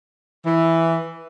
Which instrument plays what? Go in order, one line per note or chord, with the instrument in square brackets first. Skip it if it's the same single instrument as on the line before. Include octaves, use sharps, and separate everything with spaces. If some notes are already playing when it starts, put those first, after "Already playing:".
[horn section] E3